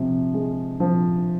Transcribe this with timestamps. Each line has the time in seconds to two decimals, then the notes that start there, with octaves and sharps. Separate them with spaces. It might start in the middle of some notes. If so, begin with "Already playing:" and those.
Already playing: C3 F3
0.34 G#3
0.80 F3